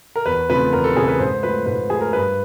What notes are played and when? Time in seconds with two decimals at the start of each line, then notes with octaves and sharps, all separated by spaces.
0.16 A#4
0.26 E2 B4
0.50 C#3 F3 A3 C4 B4
0.73 E2 A#4
0.84 A4
0.96 C#3 F3 A3 C4 G#4
1.08 B4
1.19 G#2 C5
1.43 F3 A3 B4
1.66 G#2 B4
1.90 F3 A3 G#4
2.01 A#4
2.13 G2 B4